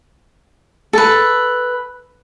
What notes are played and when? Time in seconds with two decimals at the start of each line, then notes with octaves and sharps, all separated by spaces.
0.93 A4 B4